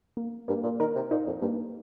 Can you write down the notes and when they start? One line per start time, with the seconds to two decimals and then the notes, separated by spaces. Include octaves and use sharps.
0.17 A#3
0.48 G2 A#3
0.64 A#2
0.80 D#3 A#4
0.96 C3
1.11 A#2 D#4
1.27 F2
1.41 G2 A#3